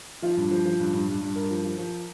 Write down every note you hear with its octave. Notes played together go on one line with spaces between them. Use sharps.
F3 F4
G2
F3
F3
G2
G2
G2
G2
G2 A#4
F3
F3
F3